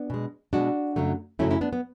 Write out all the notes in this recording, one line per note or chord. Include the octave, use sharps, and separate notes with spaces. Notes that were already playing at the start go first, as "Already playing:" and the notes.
Already playing: B3 D4
B2 G#3
B2 G#3 D4 F#4
F#2 C#3 F#3 A3
F#2 C#3 F#3 A3 C#4 E4
C#4 E4
B3 D4
B3